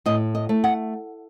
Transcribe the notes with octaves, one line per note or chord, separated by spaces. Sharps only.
A2 D#5
D#5
A3
F#5